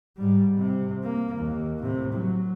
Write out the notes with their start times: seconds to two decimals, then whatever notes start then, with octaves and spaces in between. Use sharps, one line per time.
0.17 G#2 G3
0.58 C3
1.03 A#3
1.36 D#2
1.82 A2 C3
2.13 F#3